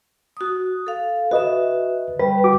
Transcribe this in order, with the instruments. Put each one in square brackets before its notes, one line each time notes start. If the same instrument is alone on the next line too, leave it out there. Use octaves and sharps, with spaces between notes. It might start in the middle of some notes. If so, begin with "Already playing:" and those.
[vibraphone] F#4 D#6
A4 F5
[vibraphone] F#4 E5 [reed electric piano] B4 D#5
[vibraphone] G3 [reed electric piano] B4
[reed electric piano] F#4 D6